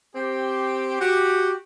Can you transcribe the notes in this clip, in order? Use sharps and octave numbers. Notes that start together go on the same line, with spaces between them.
C4 G4
F#4 G4